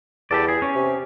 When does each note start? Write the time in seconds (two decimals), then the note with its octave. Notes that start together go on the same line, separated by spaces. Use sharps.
0.31 E2 G4 A4 D5
0.48 G#4
0.62 C#4
0.75 C3